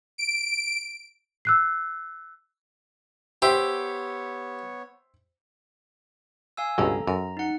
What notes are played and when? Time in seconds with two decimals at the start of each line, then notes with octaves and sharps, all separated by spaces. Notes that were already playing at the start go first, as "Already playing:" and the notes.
0.18 D7
1.45 E6 F#6 C7
3.42 B3 G4 C5 C#5 E5 G5
6.57 F5 G#5 E6
6.78 C#2 G2 B2 A4 A#5
7.07 F#2 A#5
7.37 D#4 F#5